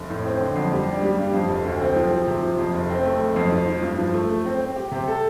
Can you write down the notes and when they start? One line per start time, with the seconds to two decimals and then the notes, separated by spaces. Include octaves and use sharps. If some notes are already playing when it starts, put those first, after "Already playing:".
Already playing: F1
0.09 A2
0.25 C4
0.41 D3
0.56 F2
0.72 G3
0.87 D4
1.03 G3
1.18 G2
1.34 F2
1.49 F1
1.65 D2
1.80 C4
1.96 F3
2.11 F3
2.27 C3
2.43 F3
2.58 F2
2.74 F1
2.90 C4
3.05 A3
3.21 F1
3.36 F2
3.52 F3
3.67 F3
3.83 G2
3.99 F3
4.14 A3
4.30 A3
4.45 C4
4.61 C4
4.76 G4
4.92 C3
5.08 A4